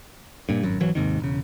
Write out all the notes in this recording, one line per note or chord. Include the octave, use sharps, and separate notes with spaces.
G2 A#2
G#1 F#2
G#1 E3 F#3
D#2 G#2 C3 D#3
E1 C#3